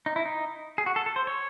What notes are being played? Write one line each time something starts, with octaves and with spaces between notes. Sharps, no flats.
D#4
E4
D#4
G#4
F#4
A4
A4
C5
C#5